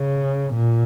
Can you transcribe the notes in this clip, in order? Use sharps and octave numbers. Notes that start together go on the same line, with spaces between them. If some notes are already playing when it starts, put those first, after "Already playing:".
Already playing: C#3
A#2